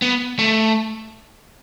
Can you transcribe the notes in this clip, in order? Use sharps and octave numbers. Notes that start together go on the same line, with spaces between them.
B3
A3